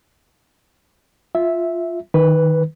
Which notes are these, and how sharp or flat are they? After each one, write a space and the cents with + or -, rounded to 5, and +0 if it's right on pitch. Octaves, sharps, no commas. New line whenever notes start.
F4 +0 E5 -5
D#3 +0 B4 +0